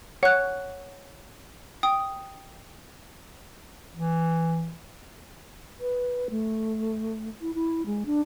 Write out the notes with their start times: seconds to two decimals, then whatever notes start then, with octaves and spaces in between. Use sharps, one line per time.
0.23 C#5 F#5 F#6
1.83 G5 D#6
3.92 E3
5.80 B4
6.30 A3
7.41 E4
7.55 E4
7.86 G#3
8.06 D4